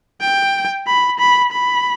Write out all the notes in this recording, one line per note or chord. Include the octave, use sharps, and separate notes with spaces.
G5
B5
B5
B5